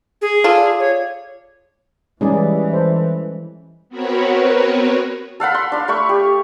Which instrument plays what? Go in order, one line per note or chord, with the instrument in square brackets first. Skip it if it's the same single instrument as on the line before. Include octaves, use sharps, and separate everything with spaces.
[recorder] G#4
[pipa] F4 A4 D5
[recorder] C#5
[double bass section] E3 [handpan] G3 G#3 C#4 [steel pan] D#4 G#4 D5
[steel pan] A4 C5
[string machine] B3 C4 F#4 A#4 B4 C#5
[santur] A4 F5 F#5 B5
C6
D4 F5
A3 B5 C#6
G4